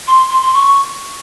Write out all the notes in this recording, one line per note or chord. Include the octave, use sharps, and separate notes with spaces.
C6
C6
C6
C#6